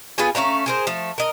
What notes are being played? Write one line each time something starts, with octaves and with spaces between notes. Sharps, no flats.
B3 F4 G#4 G#5
A3 C#4 F5 A#5
G#4 A#4 C5
F3 A3
A#4 D#5